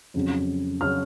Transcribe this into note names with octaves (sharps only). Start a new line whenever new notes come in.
F2 C#3 F#3 C#4
C#3 F#3 C#4 F6